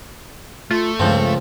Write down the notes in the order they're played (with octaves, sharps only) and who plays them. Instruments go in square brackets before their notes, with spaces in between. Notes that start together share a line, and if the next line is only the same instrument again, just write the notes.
[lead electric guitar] A3 [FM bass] F4
[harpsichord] C#2 F3 C4 [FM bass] G2